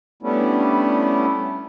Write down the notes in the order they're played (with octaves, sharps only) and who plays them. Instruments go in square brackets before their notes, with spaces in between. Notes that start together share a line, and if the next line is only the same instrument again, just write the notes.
[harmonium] G3 A3 B3 C#4 D4 E4